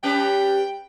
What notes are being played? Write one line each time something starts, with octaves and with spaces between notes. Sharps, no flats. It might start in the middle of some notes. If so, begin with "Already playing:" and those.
G3 C#4 B4 G5